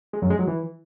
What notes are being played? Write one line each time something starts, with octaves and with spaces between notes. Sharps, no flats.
G#3
F#2
G#3
F#3
E3